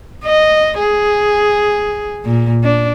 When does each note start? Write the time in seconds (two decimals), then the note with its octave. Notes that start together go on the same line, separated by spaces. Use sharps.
0.24 D#5
0.79 G#4
2.25 A#2
2.63 D4